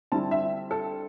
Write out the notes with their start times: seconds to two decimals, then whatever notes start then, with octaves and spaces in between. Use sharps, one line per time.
0.12 D3 G3 C4 E4 A5
0.31 E5
0.71 A4